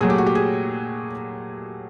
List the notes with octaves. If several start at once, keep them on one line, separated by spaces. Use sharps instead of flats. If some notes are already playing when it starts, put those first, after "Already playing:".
A#2 F#3 A3 G#4
G4
F#4
G4
G#4